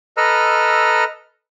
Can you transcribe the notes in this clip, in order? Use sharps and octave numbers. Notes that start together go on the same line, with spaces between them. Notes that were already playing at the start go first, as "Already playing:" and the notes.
A4 B4 D#5 A#5 E6 F6